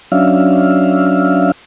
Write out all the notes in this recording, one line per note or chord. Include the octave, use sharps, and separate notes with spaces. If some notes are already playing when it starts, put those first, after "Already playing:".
F#3 C#4 D4 E5 F5